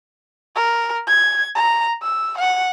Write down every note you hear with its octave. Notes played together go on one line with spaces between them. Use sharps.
A#4
G#6
A#5
E6
F#5